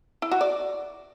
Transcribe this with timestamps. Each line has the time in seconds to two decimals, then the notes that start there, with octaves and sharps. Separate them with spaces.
0.22 E4
0.31 F#4
0.41 D5